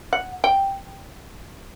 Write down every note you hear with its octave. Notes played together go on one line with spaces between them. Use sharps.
F#5
G5